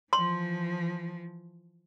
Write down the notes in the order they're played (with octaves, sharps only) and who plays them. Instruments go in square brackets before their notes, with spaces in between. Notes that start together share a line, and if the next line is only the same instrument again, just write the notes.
[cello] E3 F3 [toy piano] C6